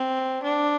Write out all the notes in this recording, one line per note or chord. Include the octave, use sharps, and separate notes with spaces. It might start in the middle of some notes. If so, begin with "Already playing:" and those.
Already playing: C4
D4